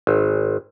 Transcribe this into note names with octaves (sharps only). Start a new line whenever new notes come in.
G#1